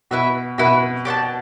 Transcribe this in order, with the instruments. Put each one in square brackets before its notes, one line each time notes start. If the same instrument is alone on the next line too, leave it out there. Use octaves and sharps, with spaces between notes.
[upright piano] B2 [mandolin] E4 B4 E5
[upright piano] B2 [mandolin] E4 B4 E5
[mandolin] G4 D5 F#5 A5